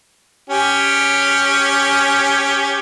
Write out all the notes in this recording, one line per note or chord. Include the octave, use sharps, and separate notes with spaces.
C#4 G4 G#5